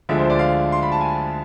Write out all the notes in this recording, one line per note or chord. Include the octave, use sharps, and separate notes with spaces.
D2 D3 F3 G#3 E5
C5
D5
F5
C6
B5
A5
G#5